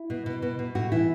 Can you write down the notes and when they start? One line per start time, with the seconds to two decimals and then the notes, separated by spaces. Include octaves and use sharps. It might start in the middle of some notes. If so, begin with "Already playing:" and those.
Already playing: E4
0.10 B2
0.26 B2
0.42 B2
0.59 B2
0.75 A2 F#4
0.92 E3 E4